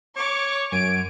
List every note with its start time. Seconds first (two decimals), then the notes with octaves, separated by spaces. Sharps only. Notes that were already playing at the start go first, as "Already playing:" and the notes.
0.16 C#5 C#6 D6
0.72 F#2 G#5 D7